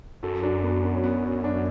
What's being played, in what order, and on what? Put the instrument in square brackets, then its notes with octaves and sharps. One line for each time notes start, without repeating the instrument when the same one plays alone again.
[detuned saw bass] F#2 [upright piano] F#4 A4
[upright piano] D4 F#4
B3
B3
C#4
B3
C#4
B3 D4